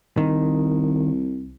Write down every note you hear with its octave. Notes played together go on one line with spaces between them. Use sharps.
C2 D#3